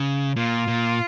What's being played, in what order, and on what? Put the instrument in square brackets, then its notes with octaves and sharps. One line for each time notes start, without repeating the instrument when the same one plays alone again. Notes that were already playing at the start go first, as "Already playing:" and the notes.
Already playing: [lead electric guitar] C#3
[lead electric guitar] A#2 [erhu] F4
[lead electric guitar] A#2